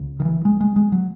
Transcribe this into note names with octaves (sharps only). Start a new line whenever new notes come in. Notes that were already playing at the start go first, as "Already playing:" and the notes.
Already playing: C#2 C#3
D#3
E3
G#3
G#3
G#3
F#3